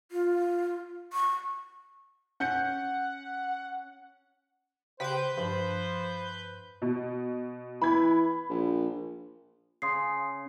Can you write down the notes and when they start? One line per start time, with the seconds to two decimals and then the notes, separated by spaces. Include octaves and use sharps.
0.12 F4
1.13 C#6
2.40 C#4 F#5 G6 C#7
5.00 C#3 G4 B4 C5 G6
5.37 G2 F3 C5
6.82 B2
7.82 E3 B5 G#6
8.50 A#1
9.82 C#3 C6 D#6 C7